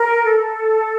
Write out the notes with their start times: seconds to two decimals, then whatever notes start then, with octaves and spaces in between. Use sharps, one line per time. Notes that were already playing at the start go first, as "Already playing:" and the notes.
Already playing: A#4
0.24 A4